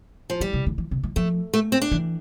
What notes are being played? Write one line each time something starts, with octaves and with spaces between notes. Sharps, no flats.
F3
E3 G3
C3
D3
E3
C3
E3
F3 A3
A3
C4
D4
E3